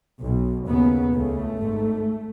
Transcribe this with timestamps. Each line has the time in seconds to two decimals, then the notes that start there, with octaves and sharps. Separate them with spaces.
0.20 B1 B2
0.67 D#2 C#3 B3
1.13 C#2 C#3 A3
1.60 G#1 G#2